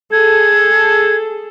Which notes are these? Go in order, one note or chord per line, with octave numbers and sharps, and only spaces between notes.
G#4 A4 G#6